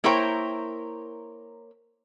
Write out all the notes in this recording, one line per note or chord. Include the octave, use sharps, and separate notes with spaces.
A#3 E4 A#4 C5 C#5 G5